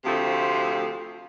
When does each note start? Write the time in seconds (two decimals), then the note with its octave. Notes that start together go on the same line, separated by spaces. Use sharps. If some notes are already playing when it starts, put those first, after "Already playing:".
0.05 D2 C3 F3 A3 C4